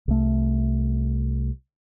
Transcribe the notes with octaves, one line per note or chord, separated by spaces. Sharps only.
C2 A3